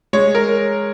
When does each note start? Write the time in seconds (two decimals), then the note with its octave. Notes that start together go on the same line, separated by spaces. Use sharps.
0.13 G#3 C#5
0.35 A#4